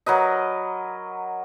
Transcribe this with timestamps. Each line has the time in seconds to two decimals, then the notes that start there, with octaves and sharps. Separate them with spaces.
0.06 F#3 A#4 B4 D#5